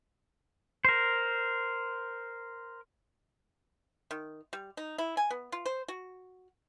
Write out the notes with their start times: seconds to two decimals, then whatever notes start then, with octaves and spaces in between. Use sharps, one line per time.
0.85 A#4 C5
4.11 D#3
4.53 G3
4.77 D#4
4.98 E4
5.17 G#5
5.31 B3
5.52 F4
5.65 C5
5.88 F#4